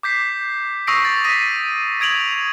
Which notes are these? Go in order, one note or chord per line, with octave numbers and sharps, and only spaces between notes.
D6 G6 B6 C7
C#6 D#6 E6 A#6 C7 D7
A6
D#6 A#6 B6 D#7
D#6 G#6 D7 F7 F#7